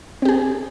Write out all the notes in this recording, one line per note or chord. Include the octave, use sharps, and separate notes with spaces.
C4 G4 G#4